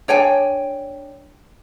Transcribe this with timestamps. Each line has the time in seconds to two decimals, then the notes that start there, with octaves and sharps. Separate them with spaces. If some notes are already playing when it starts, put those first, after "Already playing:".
0.08 D4 C#5 G5 G#5